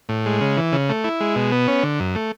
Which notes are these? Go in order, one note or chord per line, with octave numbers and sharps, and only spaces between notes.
A2
G#3
C#3
E3
C#3
A3
E4
G#3
B2
B3
C#4
D3
F#2
A3